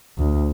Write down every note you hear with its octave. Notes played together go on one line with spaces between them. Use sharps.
D2